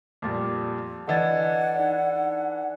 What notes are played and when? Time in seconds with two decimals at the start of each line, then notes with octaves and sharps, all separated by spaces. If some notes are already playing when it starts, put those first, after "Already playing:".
0.22 F2 A#2 G3 D6 A6
1.08 E3 D4 A4 D#5 F#5 G#6 A6
1.76 D#4 D5